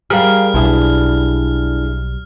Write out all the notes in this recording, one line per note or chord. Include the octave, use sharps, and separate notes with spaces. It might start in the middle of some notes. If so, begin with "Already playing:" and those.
G3 G#4 A#4 F5 F6
B1 D4 E4 G#4